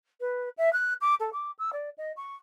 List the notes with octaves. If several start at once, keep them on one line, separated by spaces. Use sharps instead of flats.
B4
E5
F#6
D6
A4
D6
E6
D5
D#5
C#6